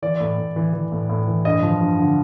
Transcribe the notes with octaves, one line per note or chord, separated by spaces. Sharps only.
E3 D5
A2
A2
E3
E3
A2
A2
E3
G2 D#5
F3
G2
D3